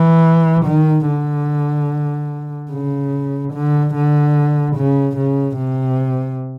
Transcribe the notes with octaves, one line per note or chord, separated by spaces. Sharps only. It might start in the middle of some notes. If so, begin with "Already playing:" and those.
Already playing: E3
D#3
D3
C#3
D3
D3
C#3
C#3
C3